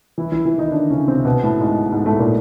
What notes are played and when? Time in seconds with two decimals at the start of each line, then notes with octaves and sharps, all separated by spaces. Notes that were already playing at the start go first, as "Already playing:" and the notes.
0.18 E3 E4
0.32 E3 E4
0.45 E3 E4
0.58 D#3 D#4
0.71 D3 D4
0.90 C#3 C#4
1.08 C3 C4
1.25 B2 B3
1.43 A2 A3
1.60 G#2 G#3
1.92 G#2 G#3
2.06 A2 A3
2.19 A#2 A#3